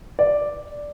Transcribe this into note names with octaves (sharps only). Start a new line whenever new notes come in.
D5